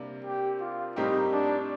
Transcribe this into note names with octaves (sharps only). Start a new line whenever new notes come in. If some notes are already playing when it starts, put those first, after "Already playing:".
Already playing: C3 G3 A#3 D4
G4
F4
A2 G3 C4 D#4 G4 A#4
D4